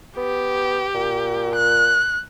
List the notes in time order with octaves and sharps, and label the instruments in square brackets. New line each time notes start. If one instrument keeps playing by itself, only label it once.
[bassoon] B3 [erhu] G4
[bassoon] A#2
[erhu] F#6